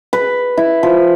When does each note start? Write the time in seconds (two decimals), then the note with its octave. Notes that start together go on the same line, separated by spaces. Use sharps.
0.13 B4
0.57 E4
0.83 F3